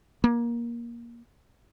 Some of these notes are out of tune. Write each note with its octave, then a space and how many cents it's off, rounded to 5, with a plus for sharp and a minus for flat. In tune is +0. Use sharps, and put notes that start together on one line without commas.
A#3 +15